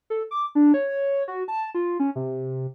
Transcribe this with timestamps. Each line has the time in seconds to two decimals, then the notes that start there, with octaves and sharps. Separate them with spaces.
0.10 A4
0.31 D6
0.55 D4
0.74 C#5
1.28 F#4
1.48 A5
1.75 F4
2.00 C#4
2.16 C3